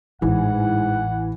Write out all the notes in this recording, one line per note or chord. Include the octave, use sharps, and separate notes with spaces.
A1 G#2 E3 F#5